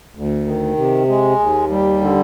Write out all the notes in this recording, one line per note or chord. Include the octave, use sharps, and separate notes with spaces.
D2
D#3
C3
G#3
D#2
G3
D3